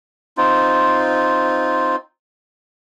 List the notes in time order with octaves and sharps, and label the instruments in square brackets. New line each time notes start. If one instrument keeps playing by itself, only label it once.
[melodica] C4 D#4 F4